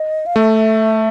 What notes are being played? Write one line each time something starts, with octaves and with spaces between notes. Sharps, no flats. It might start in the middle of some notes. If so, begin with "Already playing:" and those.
Already playing: D#5
F5
A3 E5